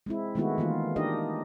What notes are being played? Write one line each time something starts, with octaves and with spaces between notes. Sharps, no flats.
G#3 C4 E4
D#3 G#3 A3 B3 E4 F#4
D#3 E3 A#3 F4
D4 D#4 G4 A#4 D#5